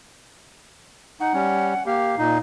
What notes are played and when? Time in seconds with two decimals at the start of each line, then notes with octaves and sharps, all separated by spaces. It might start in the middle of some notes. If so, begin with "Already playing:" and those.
1.20 D#4 F#5
1.34 G3 C#4
1.86 A#3 G4 F5
2.18 A#2 D#4